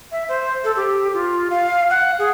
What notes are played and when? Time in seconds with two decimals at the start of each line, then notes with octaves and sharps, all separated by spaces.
0.12 E5
0.29 C5
0.64 A4
0.76 G4
1.14 F4
1.50 F5
1.90 F#5
2.19 G#4